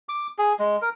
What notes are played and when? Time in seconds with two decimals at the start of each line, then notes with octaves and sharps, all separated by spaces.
0.09 D6
0.38 G#4
0.59 G#3
0.82 A#4